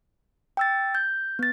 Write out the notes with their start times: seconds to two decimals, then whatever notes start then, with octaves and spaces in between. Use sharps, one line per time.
0.57 G5 E6 A6
0.95 G6
1.39 B3 A6